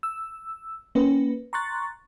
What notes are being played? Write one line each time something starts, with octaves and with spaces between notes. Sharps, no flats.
E6
A#3 C#4 B4
A#5 C6 C#6 F#6 A6